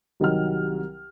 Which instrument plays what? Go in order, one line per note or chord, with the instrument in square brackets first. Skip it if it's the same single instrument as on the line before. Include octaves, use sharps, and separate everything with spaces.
[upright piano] C2 D#3 F#3 A#4 F6